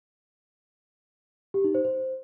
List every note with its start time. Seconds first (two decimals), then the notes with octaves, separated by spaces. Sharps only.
1.54 G4
1.64 D#4
1.75 C5
1.85 C5